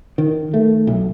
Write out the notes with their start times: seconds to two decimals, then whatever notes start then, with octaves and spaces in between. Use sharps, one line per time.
0.18 D#3
0.54 A3
0.87 B1